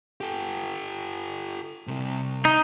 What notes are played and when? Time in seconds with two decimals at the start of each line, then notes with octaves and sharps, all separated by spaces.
0.21 G4 A4
1.87 C3 G3
2.45 D#4